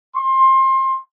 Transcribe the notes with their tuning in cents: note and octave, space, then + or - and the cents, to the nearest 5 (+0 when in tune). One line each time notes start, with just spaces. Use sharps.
C6 +25